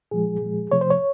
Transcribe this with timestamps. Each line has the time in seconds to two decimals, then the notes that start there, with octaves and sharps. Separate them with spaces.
0.11 A#2 F3 G#3 G#4
0.42 A#2 F3 G#3
0.72 C3 F3 A3 C#5
0.81 C5
0.90 C#5